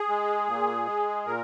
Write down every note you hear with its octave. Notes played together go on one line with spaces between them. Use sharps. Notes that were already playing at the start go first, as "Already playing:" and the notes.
Already playing: G#4
G#3
A#2
G#3
A#2 A#4